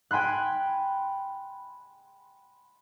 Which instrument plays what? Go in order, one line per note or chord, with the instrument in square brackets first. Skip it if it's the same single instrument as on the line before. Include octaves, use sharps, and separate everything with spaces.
[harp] G5 G#5 B5 C6 F#6